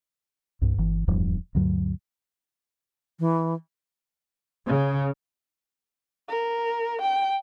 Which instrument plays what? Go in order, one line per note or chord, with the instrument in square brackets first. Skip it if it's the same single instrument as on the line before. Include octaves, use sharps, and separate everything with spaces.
[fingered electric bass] C2 G2
G1 E3
D1 E2 G2 F3
D2 G2 F#3
[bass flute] E3
[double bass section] C#3
[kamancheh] A#4
G5